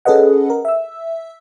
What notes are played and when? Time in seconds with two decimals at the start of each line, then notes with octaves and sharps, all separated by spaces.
0.05 C#4 G#4 A4 B4 D#5 F#5
0.50 A#4
0.65 E5 E6